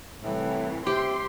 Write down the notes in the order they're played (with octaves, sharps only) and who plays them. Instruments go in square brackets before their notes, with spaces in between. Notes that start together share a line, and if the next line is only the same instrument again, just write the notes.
[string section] C2 E3 [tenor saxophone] A2
[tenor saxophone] C3 [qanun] G4 [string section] C6